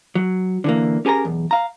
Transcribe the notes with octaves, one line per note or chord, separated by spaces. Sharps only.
F#3
D3 E3 A#3
C#4 G4 G#4 A#4 A#5
B1 E2
F5 A#5